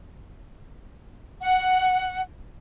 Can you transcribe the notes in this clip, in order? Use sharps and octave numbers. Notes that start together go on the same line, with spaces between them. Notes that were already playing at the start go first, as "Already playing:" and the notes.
F#5